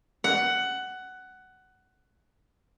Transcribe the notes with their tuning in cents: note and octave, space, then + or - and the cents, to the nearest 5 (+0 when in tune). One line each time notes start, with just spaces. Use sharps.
F#5 +15